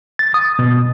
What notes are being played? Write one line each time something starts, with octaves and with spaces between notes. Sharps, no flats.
A6
D#6
B2